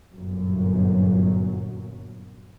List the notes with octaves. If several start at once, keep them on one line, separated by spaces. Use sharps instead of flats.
G1 F#2 A#2 F#3